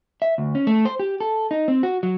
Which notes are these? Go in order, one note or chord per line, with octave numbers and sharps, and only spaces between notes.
E5
D2
C#4
A3
C5
G4
A4
D#4
C4
F#4
F#3